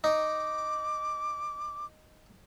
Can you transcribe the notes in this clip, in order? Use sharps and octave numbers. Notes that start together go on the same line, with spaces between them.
D#4 D6